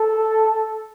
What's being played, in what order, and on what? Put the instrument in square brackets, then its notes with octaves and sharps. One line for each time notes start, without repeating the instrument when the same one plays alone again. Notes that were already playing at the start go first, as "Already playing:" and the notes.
Already playing: [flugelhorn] A4